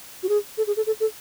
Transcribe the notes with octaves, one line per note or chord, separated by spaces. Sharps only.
F#4
G#4
A4
G#4
A4
A4
A4